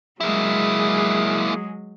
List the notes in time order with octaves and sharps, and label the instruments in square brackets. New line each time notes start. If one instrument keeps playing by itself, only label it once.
[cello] F#3 G#3 [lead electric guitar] A#3 E4 [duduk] G#4